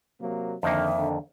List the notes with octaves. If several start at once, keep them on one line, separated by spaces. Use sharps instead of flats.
C3 F#3 A#3
F2 D3 D#3 A#3 E5
D3